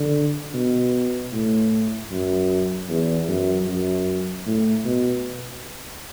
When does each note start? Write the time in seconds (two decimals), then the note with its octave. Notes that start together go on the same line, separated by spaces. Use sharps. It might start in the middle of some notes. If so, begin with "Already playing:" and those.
Already playing: D3
0.54 B2
1.32 A2
2.11 F#2
2.89 E2
3.28 F#2
3.67 F#2
4.46 A2
4.85 B2